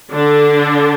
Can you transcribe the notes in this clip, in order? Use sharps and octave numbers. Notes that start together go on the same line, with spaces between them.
D3 D4